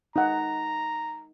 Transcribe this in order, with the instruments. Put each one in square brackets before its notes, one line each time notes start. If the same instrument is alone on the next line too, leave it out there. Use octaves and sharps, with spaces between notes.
[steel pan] D#4 F#5 [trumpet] A#5